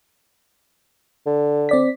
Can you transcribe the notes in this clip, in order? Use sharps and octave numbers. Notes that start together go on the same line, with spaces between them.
D3
C4 D5 B6